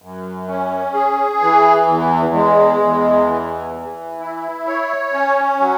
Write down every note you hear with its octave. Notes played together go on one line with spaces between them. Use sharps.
F#2
C#4
G#4
E3
E2
G#3
E2
E3
E3
E4
C#5
C#4
F#3